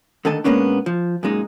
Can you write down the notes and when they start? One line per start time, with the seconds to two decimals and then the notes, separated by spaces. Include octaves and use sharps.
0.25 D3 D#3 A3 A4 D#5 A5
0.44 A#2 G#3 A#3 B3 C#4 D4
0.86 F3
1.23 F#2 A#2 G#3 D#4